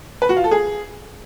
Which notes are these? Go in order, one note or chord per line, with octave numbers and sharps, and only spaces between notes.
B4
F#4
F4
A4
G#4